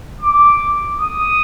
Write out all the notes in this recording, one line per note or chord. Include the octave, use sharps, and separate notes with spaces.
D6
D#6